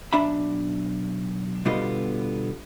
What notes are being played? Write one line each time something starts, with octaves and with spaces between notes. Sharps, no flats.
B1 D4 E5 B5
B2 D3 G3 B3 F4 D#5